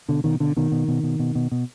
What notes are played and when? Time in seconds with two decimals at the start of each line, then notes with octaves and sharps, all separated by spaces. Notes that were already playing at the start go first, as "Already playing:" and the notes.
0.08 B2 D3
0.24 B2 D#3
0.40 B2 D3
0.57 B2 D#3
0.72 B2
0.88 B2
1.03 B2
1.19 B2
1.35 B2
1.52 B2